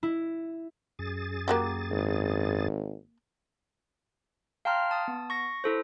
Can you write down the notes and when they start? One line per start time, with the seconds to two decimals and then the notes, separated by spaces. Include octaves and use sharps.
0.03 E4
0.99 F#2 G#4 A6
1.48 A#3 F#4 G4
1.91 G#1
4.65 F5 G5 A5 A#5 C6 F6
4.91 A5 D#6
5.08 B3
5.30 C#6 A#6
5.64 E4 A4 C5